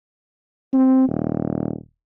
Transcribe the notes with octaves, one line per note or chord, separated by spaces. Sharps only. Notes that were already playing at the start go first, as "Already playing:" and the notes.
C4
D#1